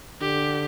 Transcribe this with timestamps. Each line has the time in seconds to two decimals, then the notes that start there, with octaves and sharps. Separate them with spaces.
0.21 D3 G4